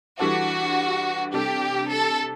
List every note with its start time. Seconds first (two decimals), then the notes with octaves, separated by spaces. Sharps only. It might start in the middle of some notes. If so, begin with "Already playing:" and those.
0.19 E3 G3 D4 F#4 A4
1.32 C3 G3 D4 G4 A4
1.90 A4